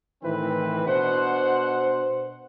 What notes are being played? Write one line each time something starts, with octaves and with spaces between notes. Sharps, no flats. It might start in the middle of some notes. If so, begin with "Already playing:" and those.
A2 D#3 E3 C4 B4
B2 D4 C5 F#5